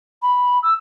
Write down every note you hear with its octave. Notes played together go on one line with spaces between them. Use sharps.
B5
E6